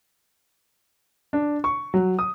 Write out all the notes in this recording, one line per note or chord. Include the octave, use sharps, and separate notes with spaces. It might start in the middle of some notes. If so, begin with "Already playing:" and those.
D4
C#6
F#3
D#6